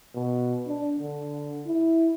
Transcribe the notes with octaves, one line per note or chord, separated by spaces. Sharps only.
B2
D4
D3
E4